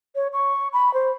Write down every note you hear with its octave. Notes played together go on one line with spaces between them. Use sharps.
C#5
C#6
B5
C5